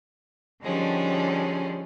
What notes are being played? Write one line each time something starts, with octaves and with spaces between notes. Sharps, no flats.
D3 D#3 F3 G3 G#3 C#4